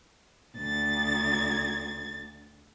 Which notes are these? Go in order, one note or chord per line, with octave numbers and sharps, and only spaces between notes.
D2 A6